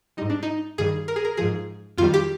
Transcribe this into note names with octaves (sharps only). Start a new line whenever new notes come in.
G#2 G3 D#4
D4
D#4
G2 D#3 G3 G#4
A#4
G#4
A#4
G#2 F3 G#4
F2 D#3 G3 F4
G4